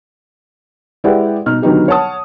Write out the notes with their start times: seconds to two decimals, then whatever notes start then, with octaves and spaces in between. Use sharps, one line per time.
1.04 G#3 E4 G4 B4 D5 F#5
1.46 B2 D#4 F6
1.62 D3 D#3 F#3 B3 D#4 G4
1.88 C#5 F#5 A5 D#6